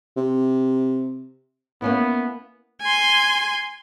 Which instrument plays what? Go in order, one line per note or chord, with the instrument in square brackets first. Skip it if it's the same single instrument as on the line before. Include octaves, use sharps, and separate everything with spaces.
[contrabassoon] C3
[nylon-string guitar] A#3 C#4 E4 [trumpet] B3
[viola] G#5 C6